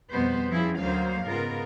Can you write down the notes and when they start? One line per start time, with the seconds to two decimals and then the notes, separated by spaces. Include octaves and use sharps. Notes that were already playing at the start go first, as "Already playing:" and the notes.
0.10 F2 B2 G3 B3 B4 C5
0.49 F3 C4 C#4 E4 G#4
0.80 D2 F#3 A#3 C5 F5
1.26 G#2 C#3 B3 F4 A#4